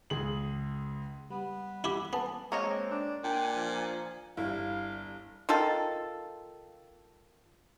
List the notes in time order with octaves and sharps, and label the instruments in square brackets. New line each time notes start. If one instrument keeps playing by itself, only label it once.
[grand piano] C#2 G#4 F#7
[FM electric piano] G3 [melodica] B3 B4
[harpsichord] E4 G4
[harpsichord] B3 [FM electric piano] G#5 A5
[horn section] G#3 C4 [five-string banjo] A#3 C#5 D#5
[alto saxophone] D4
[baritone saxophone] A#2 [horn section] D4 G#5 [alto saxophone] G5
[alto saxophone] F3
[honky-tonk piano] G1 G3 [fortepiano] E4 [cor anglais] F5
[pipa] D#3 F4 A4